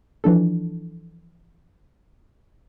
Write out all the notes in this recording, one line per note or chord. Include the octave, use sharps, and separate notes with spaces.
E3 F3 D4 A4